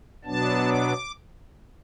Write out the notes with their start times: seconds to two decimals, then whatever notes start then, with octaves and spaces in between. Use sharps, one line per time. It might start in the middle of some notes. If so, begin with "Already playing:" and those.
0.25 B2 F#3 B3 D4 A5
0.67 D6